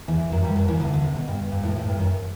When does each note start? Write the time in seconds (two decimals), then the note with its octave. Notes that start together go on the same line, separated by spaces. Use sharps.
0.08 E2 E3
0.32 F#2 F#3
0.44 G2 G3
0.56 F#2 F#3
0.68 E2 E3
0.80 D2 D3
0.94 D3
1.04 C3
1.16 B2
1.28 G2
1.52 G2
1.63 A2
1.76 A2
1.88 G2
1.99 F#2